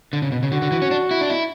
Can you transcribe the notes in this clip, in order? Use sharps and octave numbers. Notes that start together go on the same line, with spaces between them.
D3
C#3
B2
C#3
D3 F#4
D3
E3
C#4
D4
E4
D4
E4